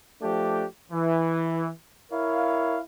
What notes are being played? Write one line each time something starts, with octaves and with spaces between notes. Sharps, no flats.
F3 A3 D4 G4
E3
E4 A#4 C#5 F5